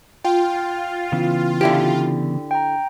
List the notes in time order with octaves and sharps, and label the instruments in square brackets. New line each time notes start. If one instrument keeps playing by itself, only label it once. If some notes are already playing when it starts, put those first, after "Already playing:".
[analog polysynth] F4 [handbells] G5
[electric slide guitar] C#3 E3 B3
[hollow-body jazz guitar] D3 E4 G4
[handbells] G5 A#5